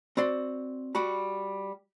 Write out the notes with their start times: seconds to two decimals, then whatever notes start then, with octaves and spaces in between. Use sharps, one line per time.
0.17 C4 F#4 D5 C6
0.95 G3 F#4 B5